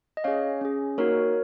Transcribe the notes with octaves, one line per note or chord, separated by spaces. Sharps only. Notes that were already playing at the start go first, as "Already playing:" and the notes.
D#5
C#4 G#4 C#5 F5
C#4 G#4
A#3 D#4 F#4 A#4 C#5